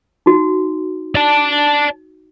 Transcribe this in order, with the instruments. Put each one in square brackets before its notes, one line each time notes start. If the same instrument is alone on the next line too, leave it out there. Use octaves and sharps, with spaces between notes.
[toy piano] D#4 F#4
[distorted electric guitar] D5 A5